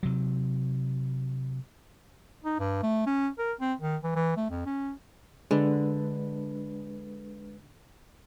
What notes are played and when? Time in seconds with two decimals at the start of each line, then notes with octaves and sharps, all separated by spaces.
0.03 C3 F#3
2.44 D#4
2.60 G2
2.83 A3
3.06 C#4
3.39 A#4
3.61 C4
3.81 D#3
4.04 E3
4.16 E3
4.37 A3
4.50 F2
4.66 C#4
5.51 D3 G#3 D4 B4